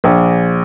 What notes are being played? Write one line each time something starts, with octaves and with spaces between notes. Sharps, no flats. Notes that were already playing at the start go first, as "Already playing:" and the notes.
A#1